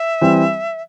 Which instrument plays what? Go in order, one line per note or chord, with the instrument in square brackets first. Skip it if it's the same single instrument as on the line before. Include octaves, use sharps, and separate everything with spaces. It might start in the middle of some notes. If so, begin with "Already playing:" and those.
Already playing: [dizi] E5
[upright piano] E3 G3 C4